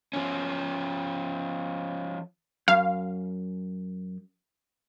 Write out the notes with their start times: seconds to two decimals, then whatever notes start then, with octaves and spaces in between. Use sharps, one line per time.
0.13 F3 C#4
2.68 F#2 F5